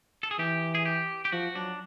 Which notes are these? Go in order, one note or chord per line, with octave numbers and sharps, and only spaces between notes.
A4
G#4
E3 G4
G#4
G4
G4
F3 F#4
F#3 D4